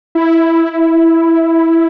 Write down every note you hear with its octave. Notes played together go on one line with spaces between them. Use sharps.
E4